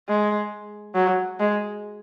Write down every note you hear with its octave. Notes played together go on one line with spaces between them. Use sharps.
G#3
F#3
G#3